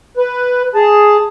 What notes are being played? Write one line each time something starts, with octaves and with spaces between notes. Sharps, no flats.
B4
G#4 A5